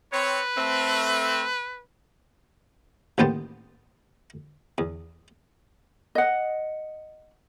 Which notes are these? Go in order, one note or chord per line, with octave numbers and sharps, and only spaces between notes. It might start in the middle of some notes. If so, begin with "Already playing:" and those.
C4 B4 C#5
A3 C4
A1 D#2 B3 G4 C5 A5
E2
D#5 F#5